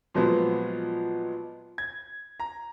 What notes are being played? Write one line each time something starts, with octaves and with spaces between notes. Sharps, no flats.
A#2 F3 F#3 G#3 B3
G#6
A#5